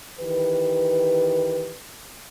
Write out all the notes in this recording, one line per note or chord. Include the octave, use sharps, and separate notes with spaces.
D#3 E3 G4 B4